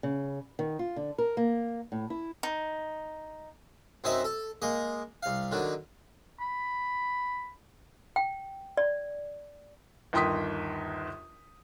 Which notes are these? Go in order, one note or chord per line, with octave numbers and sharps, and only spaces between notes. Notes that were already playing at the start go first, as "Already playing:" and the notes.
C#3
D#3
F4
D3
A#4
A#3
A2
E4
D#4
F#2 C4 D#4 C5 D#5 E5
A4
G#3 A#3 D#5
C2 F5
D3 D#3 F#3
B5
G5
D5
G1 D#2 G5 C6 D#6 B6